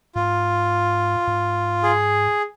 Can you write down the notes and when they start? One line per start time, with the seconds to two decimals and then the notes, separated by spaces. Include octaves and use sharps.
0.15 G#2 F4
1.27 G#2
1.83 G#4